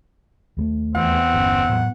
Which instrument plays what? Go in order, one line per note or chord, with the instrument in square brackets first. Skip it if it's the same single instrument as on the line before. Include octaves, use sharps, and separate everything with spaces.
[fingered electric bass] D#2 G3 A3
[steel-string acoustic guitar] E2 [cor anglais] C4 [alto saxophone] F#5
[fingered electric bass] G1 C#4
A2 F#3